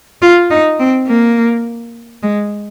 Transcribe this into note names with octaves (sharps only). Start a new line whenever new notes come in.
F4
D#4
C4
A#3
G#3